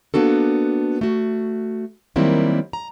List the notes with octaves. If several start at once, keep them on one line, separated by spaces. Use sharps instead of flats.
A#3 B3 D4 F#4 A4
A3 F#4
D#3 F#3 G3 A#3 C4 E4
A#5